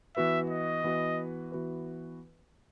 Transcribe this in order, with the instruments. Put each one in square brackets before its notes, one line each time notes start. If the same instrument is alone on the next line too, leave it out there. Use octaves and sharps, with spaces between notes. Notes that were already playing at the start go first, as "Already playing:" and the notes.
[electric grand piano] E3 B3 F#4 B4 [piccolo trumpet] E5
[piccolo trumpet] D#5
[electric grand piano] E3 B3 F#4 B4
E3 B3 F#4 B4